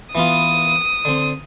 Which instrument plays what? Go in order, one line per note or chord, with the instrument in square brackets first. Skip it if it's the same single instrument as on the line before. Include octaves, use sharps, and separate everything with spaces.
[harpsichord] E3 B3 F4 [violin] D#6
[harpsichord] D3 C4